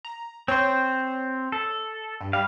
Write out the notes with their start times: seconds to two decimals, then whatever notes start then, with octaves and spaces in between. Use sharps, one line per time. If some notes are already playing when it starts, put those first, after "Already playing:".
0.05 A#5
0.48 C4 C5 C#5
1.52 A4
2.21 G2
2.33 G3 F5